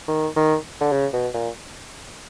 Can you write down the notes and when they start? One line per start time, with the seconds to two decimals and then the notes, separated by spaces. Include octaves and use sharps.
0.08 D#3
0.36 D#3
0.81 D3
0.92 C#3
1.13 B2
1.34 A#2